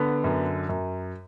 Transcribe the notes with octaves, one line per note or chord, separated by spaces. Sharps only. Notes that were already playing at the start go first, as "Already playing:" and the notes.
Already playing: D3 B3
F#2
F#2